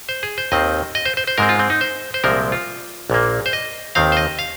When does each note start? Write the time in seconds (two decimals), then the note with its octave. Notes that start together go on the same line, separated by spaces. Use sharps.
0.09 C5
0.23 G#4
0.38 C5
0.52 D#2 D#3 C4 D#5
0.95 D#5
1.05 C5
1.17 C5
1.27 C5
1.38 G#2 G#3 C4 A#4
1.49 F4
1.59 C4
1.70 D#4
1.81 C5
2.14 C5
2.24 C2 A#2 F3 G#3 C4 A#4
2.52 F4
3.10 A#1 A#2 A#3
3.46 C5
3.53 D#5
3.95 D#2 D#3 C4 F5
4.12 C5
4.17 D#5
4.39 F5